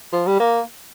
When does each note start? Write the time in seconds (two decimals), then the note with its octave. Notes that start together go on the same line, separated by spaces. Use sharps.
0.13 F3
0.27 G3
0.40 A#3